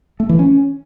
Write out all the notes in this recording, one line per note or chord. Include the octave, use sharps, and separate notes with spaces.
A3
E3
C#4